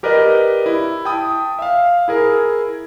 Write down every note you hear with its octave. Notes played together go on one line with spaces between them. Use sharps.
G4 A#4 B4 D5 D#5
E4
G5 A5 D#6
E5 F5
E4 G#4 A#4